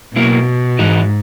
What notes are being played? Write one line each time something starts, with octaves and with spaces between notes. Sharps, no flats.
B2 F#3 A#3 E4
G#2 E3 G#3 D#4 F#4